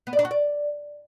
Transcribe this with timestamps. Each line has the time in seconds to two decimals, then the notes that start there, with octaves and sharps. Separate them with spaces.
0.07 B3
0.13 D5
0.19 D4
0.25 F#4
0.31 D5